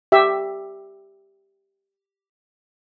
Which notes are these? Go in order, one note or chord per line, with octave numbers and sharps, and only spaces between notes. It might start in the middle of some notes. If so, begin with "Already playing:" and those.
G4 E5